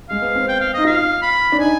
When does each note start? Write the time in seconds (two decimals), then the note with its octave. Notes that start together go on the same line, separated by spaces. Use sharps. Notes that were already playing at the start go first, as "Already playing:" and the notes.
0.09 G#3 F5
0.22 B3
0.35 C4
0.48 G5
0.60 F5
0.74 D#4 D#5
0.84 F4 F5
1.22 B5
1.52 D4
1.59 D#4 G#5